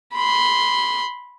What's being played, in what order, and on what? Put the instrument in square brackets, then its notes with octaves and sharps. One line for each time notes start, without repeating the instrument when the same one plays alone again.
[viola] B5 C6